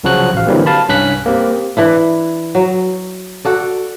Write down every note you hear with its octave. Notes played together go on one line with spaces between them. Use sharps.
C2 C#3 F3 F#3 F#4 F#6
A1 F5
D3 E3 F#3 G3 A#3 C4
F5 A5 B5
C2 G2 C#4 F#6 B6
A#3 C4 G4
E3 D4 E4
F#3
F#4 A4 D5